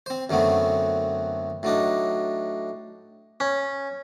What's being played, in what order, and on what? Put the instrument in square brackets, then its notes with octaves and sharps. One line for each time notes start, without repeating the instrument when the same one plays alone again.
[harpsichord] C4 C5
F#2 D3 F#3 A3 B3 C4
A2 F#3 D4 D#4
C#4